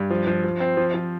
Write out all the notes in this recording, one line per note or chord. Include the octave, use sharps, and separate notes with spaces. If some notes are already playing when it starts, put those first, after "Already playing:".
Already playing: G2
F3
F3
F3
C4
F3
F3